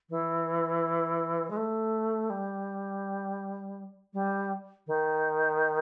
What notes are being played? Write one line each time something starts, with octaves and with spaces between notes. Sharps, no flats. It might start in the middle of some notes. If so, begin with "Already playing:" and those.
E3
G#3
A3
G3
G3
D#3